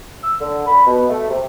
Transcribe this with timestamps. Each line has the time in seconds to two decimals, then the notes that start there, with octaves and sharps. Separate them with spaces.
0.23 E6
0.41 D3
0.67 B5
0.87 B2
1.09 A3
1.30 C3